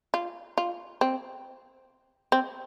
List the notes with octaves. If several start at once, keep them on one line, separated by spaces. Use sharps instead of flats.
F4
F4
C4
C4